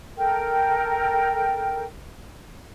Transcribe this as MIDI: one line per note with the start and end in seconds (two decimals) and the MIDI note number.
0.16 1.83 69
0.16 1.83 70
0.16 1.83 79